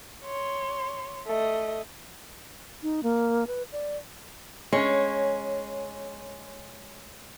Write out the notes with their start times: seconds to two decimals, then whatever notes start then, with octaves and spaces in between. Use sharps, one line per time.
0.24 C#5 C6
1.26 A3 D#5
2.83 D#4
3.03 A#3
3.47 B4
3.72 D5
4.73 G#3 C#4 C#5